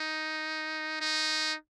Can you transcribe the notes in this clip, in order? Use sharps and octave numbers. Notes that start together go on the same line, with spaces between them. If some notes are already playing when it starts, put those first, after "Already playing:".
Already playing: D#4
D#4